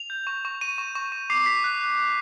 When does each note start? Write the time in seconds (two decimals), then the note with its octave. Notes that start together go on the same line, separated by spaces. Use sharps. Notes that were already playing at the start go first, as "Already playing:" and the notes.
Already playing: F7
0.10 G6
0.27 C#6
0.45 C#6
0.61 C#6 D#7
0.78 C#6
0.95 C#6
1.12 C#6
1.30 D6 C7
1.46 D6 B6
1.64 F#6
1.81 F#6
1.98 F#6